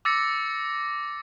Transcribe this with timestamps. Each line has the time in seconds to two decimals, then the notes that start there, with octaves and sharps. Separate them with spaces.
0.05 D6 E6 A6 A#6 C#7